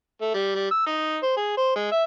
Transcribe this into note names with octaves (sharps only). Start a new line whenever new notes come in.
A3
G3
G3
E6
D#4
C5
G#4
C5
G#3
E5